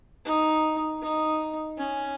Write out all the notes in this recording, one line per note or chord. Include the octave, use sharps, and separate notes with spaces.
D#4
D#4
C#4